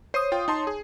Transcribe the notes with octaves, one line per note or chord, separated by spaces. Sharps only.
C5 C#5 D#6 C7 D#7
F4 G5
D#4 A5 C6
G#4